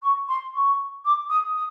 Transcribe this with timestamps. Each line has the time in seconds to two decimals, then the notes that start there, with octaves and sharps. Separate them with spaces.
0.02 C#6
0.28 C6
0.54 C#6
1.05 D6
1.29 D#6
1.55 D#6